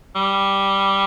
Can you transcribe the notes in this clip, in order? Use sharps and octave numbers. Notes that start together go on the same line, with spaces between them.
G3